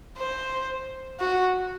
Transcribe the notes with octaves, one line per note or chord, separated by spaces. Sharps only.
C5
F#4